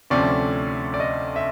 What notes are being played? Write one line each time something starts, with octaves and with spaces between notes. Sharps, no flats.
D2 C3 F3 A3 C#4 D5
D5
D#5
E5